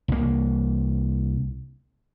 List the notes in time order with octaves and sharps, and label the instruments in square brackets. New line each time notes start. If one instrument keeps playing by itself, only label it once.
[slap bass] C2 A#3